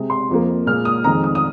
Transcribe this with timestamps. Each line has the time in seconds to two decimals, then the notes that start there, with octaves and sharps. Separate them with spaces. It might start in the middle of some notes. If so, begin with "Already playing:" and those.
Already playing: C3 G#3
0.10 C6
0.29 F2 F3 A#3
0.66 A#2 G#3 F6
0.85 D#6
1.04 F2 D#3 G#3 A#5
1.24 D#6
1.35 D#6